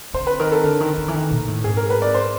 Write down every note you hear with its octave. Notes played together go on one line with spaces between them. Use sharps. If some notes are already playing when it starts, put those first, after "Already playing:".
D3 C5
B4
D#3 A#4
A4
D3
D#3
D#3
E3
D#3
A#2
A2
G#2 G#4
A#4
B4
D5
C5